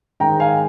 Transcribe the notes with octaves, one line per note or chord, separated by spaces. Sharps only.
G#2 D#3 G#3 G5 A#5
F5 G#5